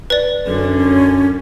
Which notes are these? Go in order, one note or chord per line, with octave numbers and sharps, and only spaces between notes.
B4 D5
F#2 D3 C#4